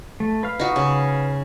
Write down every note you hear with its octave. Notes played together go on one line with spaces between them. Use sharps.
A3
B4 F5 F6
D#4 F#4
C#3